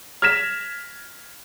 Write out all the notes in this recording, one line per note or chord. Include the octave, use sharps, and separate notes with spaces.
F6 G#6 A#6 B6 E7